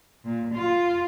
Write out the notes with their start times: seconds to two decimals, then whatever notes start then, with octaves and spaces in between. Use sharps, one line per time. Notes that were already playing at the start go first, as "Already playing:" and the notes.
0.25 A#2
0.55 F4